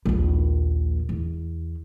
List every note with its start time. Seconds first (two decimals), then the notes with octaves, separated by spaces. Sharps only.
0.05 A#1 D#2
1.09 E2